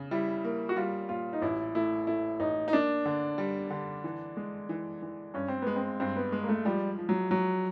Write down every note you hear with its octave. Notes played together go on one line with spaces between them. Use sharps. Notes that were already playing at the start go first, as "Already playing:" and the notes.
Already playing: C#3
G3 E4
A#3
F#4
G3 F4
A#2 F4
D#4
A1 E4
A3 E4
A3 E4
A1 D#4
D#4
A#3 D4
D3
G3
D3
E3
G#3
E3
E3
G2 C#4
C4
G#3 B3
C4
G2 C4
B3
G#3
A#3
A3
F3 G3
F3
F#3
F3 F#3